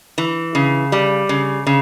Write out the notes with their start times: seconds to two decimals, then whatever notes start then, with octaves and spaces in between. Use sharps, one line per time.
0.18 E3
0.55 C#3
0.92 G3
1.29 C#3
1.67 C#3